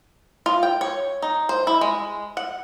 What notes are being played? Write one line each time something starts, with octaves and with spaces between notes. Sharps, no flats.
F4
G5
C#5
D#4
C5
E4
G#3
F#5